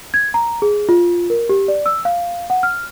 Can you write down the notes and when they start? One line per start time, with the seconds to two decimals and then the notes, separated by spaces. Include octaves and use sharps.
0.14 G#6
0.34 A#5
0.62 G#4
0.89 F4
1.30 A#4
1.49 G4
1.68 D5
1.86 E6
2.05 F5
2.50 F#5
2.63 F6